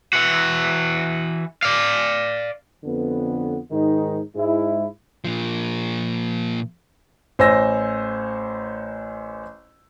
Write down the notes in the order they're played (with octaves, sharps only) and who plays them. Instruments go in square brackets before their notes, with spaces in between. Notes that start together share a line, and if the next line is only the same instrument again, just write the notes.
[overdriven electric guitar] E3 F#4
D5 F5
[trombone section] F2 D3 B3
G#2 D#3 D#4
G#2 G#3 E4
[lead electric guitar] A#2 F3
[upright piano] A1 C5 C#5 G#5 E6 A#6